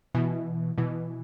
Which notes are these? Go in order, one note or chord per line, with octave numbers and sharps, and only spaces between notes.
B2 E3
B2 E3